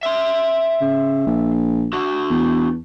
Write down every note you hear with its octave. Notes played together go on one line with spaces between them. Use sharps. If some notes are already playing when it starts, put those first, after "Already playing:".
E5 C6
C#3
A#1
D4 F#4
E2